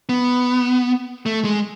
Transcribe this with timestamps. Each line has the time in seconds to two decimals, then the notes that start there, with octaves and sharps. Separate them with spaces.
0.09 B3
1.26 A3
1.44 G#3